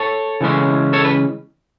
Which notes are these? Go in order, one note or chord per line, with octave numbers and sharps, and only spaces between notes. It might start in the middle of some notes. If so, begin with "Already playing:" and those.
Already playing: A4 C#5
C#3 E3 G#3 C#4
A4 C#5
B4